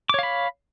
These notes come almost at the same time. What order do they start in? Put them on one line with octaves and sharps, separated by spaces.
D6 C#5 F5 B5